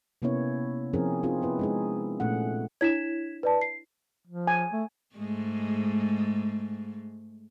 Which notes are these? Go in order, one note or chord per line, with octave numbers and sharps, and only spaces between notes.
C3 A#3 B3 C#4 E4 C#5
F3 C4 C#4 E4 G#4 A#4
C4 D#4 F4 G#4
B3 E4 B4
G#3 D#4 G#4
A#2 A3 C#4 F#5
D4 E4 C#5 G#6 B6 E7
B4 D5 A5
C7
F3
G#5
A3
G#2 G#3 A3